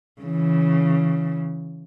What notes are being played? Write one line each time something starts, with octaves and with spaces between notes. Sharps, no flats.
C#3 E3